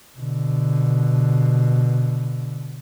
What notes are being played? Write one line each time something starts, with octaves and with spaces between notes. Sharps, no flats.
B2 D3